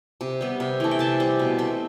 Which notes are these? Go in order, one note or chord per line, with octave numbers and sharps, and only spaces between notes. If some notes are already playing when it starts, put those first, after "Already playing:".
C3
G3 B3
C3
E3 A3
G5
C3 A5
G3 C4
B2
A3 C4